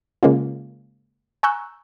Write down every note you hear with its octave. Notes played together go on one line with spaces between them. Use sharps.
C#3 G#3 A#3 C#4 F4
G#5 A#5 C#6 E6 F#6 G6